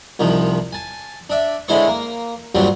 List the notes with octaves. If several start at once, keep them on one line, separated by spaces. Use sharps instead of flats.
C2 D#3 F3
G#5 A5
D4 E5
D3 G#3 E4 C5 C#5 C#6
A#3
G2 A#2 F#3 G3 C4